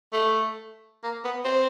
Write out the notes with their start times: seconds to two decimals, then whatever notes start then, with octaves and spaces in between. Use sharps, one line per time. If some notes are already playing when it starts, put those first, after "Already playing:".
0.13 A3
1.04 A#3
1.24 B3
1.45 C4